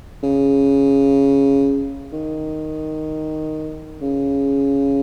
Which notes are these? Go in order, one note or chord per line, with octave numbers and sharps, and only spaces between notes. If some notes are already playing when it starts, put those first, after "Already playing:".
C#3
D#3
C#3